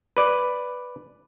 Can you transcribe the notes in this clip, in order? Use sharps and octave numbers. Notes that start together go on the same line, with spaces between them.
B4 D5